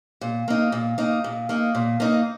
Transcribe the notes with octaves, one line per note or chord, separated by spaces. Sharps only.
A#2
A#3 D#4
A#2
A#3 D#4
A#2
A#3 D#4
A#2
A#3 D#4